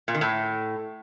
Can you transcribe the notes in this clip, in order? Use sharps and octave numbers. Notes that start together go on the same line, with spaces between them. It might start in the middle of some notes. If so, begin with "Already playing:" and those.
A#2
D#3
A2